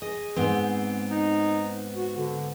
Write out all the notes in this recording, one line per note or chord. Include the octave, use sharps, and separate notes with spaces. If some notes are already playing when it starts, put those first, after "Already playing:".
G#4 D#5
G#2 B3 C4
D#4
F#4
D3